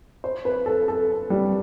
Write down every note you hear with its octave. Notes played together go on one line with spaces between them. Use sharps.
C5
B4
A4
A4
G3